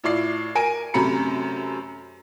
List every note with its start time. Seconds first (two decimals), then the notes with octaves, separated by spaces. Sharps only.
0.04 A2 E4 F4 D5 C7
0.55 A#4 G#5 D7
0.94 F#2 C3 A3 A#5 B5 C#7